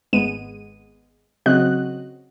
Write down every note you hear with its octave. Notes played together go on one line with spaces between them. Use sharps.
G#1 G#3 B3 D#7
C#3 F#3 C4 F#4 D#5 F#6